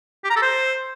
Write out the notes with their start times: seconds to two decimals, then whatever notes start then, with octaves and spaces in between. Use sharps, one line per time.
0.24 G4
0.30 A#5
0.36 A4
0.42 C5